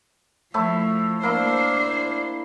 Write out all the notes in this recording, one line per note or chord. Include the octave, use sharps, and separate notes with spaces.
F3 A3 E4 C#6
A#3 D4 E4 C5